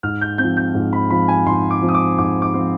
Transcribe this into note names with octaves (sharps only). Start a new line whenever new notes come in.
G#2 F6
G6
F3 C4 G6
G6
G#2
B5
F3 C4 B5
G#5
G#2 C6
D6
F3 C4
D#6
D6
G#2 D6
D6
F3 C4